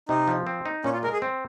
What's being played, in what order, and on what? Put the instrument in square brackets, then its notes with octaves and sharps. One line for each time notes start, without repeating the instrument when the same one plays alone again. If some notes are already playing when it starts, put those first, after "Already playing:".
[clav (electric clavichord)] C3 [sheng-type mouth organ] D#4
[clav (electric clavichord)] F3
C4
D#4
[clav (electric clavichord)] A#2 [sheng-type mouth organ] C#4
[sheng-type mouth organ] F4
[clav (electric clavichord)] G#3 [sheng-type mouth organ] A#4
[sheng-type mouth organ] G#4
[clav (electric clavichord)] C4